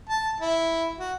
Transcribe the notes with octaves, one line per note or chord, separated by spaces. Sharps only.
A5
E4
F#4